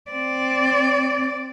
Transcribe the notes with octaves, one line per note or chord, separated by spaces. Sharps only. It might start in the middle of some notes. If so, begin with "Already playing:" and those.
C4 D5